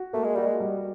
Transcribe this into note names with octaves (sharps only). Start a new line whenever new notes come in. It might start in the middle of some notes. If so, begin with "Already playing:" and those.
Already playing: F#4
A3 A#3
G#3
G3 F#4
G#3
G3